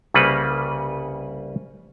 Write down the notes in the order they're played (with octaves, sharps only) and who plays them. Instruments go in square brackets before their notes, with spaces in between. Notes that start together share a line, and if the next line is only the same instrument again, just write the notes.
[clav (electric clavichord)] C2 C#3 G3 A#3 B4 F#5